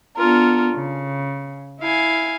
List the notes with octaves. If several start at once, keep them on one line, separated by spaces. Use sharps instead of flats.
B3 D4 F4 A4 A#4
C#3
E4 F5 G#5